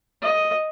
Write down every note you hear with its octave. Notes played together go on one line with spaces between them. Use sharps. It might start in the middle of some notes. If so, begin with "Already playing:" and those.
D#5